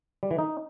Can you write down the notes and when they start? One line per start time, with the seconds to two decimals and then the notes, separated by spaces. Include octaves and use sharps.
0.23 G3
0.31 E3
0.39 D#4